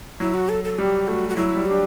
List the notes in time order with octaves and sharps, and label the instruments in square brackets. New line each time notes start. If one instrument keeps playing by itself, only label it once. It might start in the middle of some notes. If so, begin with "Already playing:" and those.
[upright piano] F#3 [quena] E4
[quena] F#4
A4
A4
[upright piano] G3 [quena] G4
[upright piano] A3 [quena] F#4
[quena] F#4
[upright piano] F#3 [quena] E4
[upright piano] G3
[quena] G4
[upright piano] D4